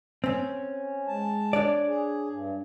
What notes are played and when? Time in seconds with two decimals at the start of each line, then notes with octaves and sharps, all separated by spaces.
0.24 C4 C#4
1.08 G#3 A5
1.53 D4 C#5 D5
1.88 G#4
2.30 G2